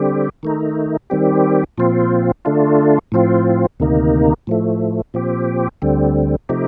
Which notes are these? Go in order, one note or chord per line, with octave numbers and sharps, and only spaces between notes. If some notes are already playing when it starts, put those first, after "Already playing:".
Already playing: D3 G3 C4 G4
D#3 A3 D#4
D#3 G3 C4 G4
A#2 F3 C4 F4
D3 A3 D4 F4
A2 F3 C4 F4
D2 C3 D#3 A#3 D#4
A2 F3 A3
A#2 F3 C4 G4
D2 D3 G3 C4
C3 F3 A3 D#4 G4